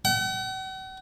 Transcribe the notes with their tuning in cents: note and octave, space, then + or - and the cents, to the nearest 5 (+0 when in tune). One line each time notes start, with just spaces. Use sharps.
F#5 +45